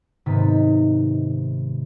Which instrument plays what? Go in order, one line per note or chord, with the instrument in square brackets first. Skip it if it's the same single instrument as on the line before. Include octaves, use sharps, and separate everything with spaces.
[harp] G#2 C3 D#3 B3 A6 B6